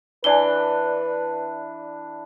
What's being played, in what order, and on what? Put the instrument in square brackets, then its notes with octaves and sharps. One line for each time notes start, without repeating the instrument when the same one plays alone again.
[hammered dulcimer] E3 D4 [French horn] B4 [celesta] D5 G7